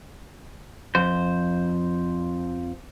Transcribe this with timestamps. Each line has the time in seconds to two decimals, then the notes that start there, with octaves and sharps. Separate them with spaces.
0.95 F2 C5